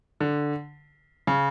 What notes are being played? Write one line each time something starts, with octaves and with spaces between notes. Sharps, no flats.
D3
C#3